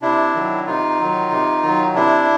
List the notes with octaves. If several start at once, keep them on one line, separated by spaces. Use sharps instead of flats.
C3 D4 E4
D#3 F#3
C3 D#4 F4
D#3 F#3
C3
D#3 F#3
C3 D4 E4